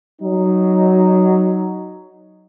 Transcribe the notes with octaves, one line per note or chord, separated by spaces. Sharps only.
F#3 D#4